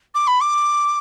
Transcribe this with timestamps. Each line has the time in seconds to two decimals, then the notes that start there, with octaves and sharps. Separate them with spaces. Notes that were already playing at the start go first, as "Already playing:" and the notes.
0.15 D6
0.27 B5
0.40 D6